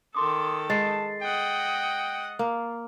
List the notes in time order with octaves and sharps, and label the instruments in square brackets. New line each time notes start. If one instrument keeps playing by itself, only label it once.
[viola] D#3 A4 [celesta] C6 D6 D#6
[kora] G#3 [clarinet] A5 [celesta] A6 C7
[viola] D#5 F#5 [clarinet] G5
[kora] A#3